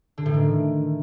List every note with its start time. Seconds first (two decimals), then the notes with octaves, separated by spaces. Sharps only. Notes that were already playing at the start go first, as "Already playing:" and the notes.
0.18 D3
0.26 A2
0.34 D#3